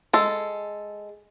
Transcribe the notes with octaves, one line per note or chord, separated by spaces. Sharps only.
G#3 A4